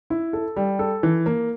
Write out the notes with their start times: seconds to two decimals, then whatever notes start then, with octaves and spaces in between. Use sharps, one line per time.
0.10 E4
0.33 A4
0.56 G3
0.79 A4
1.03 E3
1.26 A#3